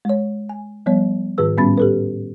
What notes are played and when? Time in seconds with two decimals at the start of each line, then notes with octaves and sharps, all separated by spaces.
0.05 G#3 C#5
0.49 G#5
0.86 F3 G3 B3 C#5
1.38 G#2 D#3 G#4 B4 E6
1.57 A2 G3 B3 C#4 B5 A6
1.78 G4 A4 B4